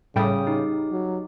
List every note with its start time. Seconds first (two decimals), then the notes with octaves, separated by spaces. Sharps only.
0.16 A2 C#3 G3 G5 D#6
0.47 D#4 G4
0.92 F#3